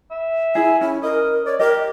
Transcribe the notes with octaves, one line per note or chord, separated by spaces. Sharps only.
E5
E4 G#4 G#5
C#4 E4
A#4 D#5
C#5 D5
G4 A#4 D#5